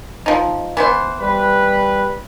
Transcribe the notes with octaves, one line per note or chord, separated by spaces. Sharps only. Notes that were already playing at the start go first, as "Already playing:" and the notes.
F3 D#4
E3 B3 C5
G3 B4